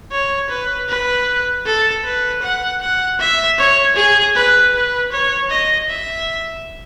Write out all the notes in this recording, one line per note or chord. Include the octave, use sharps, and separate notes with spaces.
C#5
B4
B4
A4
B4
F#5
F#5
E5
C#5
G#4
B4
B4
C#5
D#5
E5